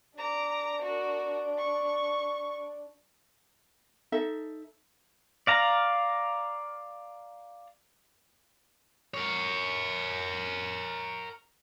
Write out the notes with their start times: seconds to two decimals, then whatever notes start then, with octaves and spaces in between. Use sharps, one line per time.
0.18 D4 A#5 D6
0.82 F#4 A#4
1.59 C#6
4.12 D#4 A4 E5
5.47 D5 F5 A#5
9.14 A#4 C#5